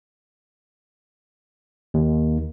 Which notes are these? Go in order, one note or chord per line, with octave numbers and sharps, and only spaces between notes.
D#2